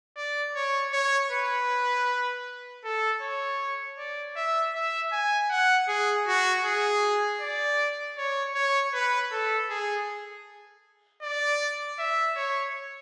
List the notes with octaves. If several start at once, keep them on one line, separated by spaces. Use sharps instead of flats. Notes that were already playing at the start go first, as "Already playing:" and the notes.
D5
C#5
C#5
B4
A4
C#5
D5
E5
E5
G#5
F#5
G#4
F#4
G#4
D5
C#5
C#5
B4
A4
G#4
D5
E5
C#5